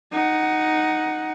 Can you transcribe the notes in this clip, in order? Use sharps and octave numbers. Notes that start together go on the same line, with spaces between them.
D#4 F#5